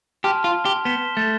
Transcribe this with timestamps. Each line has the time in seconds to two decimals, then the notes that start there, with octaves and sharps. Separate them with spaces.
0.24 G4 A5 C6 F6
0.44 F4
0.65 G4
0.85 B3 G6 B6 E7 G7
1.17 A3